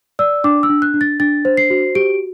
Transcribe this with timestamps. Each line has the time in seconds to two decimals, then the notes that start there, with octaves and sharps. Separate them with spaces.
0.19 D5 E6
0.44 D4 D6
0.63 E6
0.69 D4
0.82 F#6
0.94 D4
1.01 A6
1.20 D4 A6
1.45 C5
1.57 C7
1.70 F#4
1.95 G4 D7